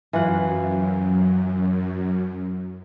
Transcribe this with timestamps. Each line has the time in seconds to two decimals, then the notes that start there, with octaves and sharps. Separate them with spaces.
0.13 F#2 E3 F4 F#5